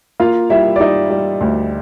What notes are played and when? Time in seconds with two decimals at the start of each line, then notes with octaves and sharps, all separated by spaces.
0.20 A#3 F4 F5
0.50 G3 E4 E5
0.76 D5
0.80 G3 D#4 D#5
1.10 G3
1.41 D2